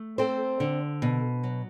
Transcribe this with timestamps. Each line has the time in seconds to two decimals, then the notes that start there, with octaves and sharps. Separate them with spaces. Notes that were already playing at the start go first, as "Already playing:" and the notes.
Already playing: A3
0.18 C4 A4 C5
0.60 D3
1.02 B2
1.43 F#3